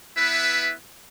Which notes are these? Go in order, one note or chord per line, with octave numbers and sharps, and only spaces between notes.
B3 E4 B4 E5